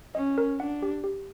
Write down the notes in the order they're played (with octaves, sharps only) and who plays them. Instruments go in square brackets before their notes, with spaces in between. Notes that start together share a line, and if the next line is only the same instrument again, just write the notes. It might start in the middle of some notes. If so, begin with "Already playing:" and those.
[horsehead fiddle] C#4 [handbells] D#5
[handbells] A#4
[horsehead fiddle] D4 [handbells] F#5
[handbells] G4
G4